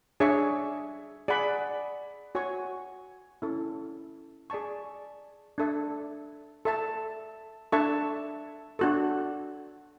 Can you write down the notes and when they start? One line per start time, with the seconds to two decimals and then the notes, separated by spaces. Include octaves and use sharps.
0.20 D4 G#4 C#5 E5
1.28 G#4 D5 F#5 B5
2.35 F#4 C#5 G#5 C#6
3.42 C#4 E4 A4
4.50 G#4 D5 A5 C#6
5.58 D4 A4 E5
6.65 A4 E5 A5
7.72 D4 A4 E5 A5 C#6
8.79 D4 F#4 A4